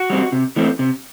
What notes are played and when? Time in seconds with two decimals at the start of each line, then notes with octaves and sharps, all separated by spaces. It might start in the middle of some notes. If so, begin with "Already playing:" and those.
Already playing: F#4
0.10 G3 C4
0.32 C3
0.56 E3 A3 C4
0.79 C3